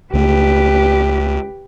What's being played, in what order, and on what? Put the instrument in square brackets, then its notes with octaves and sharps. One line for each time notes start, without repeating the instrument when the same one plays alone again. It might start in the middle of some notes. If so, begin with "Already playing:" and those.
[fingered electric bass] C#2 A3 [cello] G4 B4